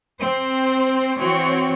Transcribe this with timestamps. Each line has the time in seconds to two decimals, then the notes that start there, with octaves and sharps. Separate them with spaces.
0.19 C4 C5
1.18 E3 C4 F#4 C#5